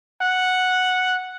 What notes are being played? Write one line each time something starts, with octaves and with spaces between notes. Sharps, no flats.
F#5